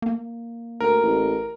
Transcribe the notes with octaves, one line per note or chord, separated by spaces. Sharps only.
A#3
D2 A#4
A1